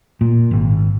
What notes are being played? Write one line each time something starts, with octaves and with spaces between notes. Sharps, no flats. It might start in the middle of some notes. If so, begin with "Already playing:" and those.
A#2
G#1